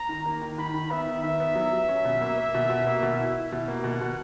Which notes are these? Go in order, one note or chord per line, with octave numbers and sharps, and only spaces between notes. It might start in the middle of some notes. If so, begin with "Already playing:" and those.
Already playing: A#5
D#3
A#3
D#3
D#3 B5
D#3
B3 E5
D#3
D#3 E5
B3
F#3
F#3
C#4
B2
A#3
A#3
B2
B2
A#3
B2
E4
E4
B2
A#3
B2 F#5
B2